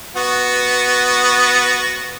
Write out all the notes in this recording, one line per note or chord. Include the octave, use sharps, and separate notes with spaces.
B3 F#4